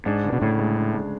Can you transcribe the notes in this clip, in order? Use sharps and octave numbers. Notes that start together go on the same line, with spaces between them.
G#2 D4
C#3
B2
D2 A2
G#3
D4
D2